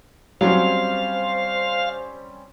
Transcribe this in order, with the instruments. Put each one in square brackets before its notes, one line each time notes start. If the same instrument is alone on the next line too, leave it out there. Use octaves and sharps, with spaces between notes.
[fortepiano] F#3 [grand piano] G3 C4 C#4 [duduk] C5 [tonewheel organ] F5